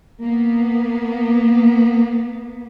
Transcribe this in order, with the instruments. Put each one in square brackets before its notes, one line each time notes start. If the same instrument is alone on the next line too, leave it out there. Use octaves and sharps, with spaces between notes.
[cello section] A#3 B3